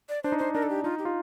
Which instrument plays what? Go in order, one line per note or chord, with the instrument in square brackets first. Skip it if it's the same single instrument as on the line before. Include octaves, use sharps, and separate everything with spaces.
[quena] D5
[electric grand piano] D4 [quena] C5
[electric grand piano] D#4
[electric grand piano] D4 [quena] C5
[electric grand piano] D4 [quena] A#4
[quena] A4
G4
[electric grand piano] D#4 [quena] F4
[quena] G4
[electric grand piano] F4